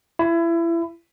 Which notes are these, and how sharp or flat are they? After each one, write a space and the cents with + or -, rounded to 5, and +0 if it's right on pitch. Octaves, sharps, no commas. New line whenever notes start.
E4 +25